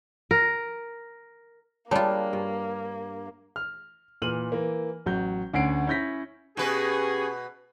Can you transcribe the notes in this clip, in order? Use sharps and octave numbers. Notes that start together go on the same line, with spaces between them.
A#4
G3 A#3 D4 F4 G#4 C#5 A5
G2
F6
A#2 E3 F6 D#7 F#7
E3 A#3
A1 F#3 G6
D2 C#4 F#5 C7 D7
C#4 E4 G6 A#6 B6
B2 C#4 G4 G#4 B4